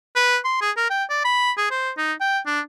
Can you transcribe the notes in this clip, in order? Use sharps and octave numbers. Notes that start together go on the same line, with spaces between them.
B4
C6
G#4
A#4
G5
D5
B5
G#4
C5
D#4
G5
D4